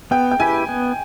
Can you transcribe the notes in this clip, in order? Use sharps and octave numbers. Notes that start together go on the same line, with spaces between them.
B3 G5
G5
E4 G4 B4 G#5
B3